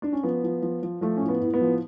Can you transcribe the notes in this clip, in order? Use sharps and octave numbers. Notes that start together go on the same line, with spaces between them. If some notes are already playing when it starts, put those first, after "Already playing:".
D4
C#4
F3 B3
F3
F3
F3
F3 A3
A2 C#4
B3
A2
B3
F3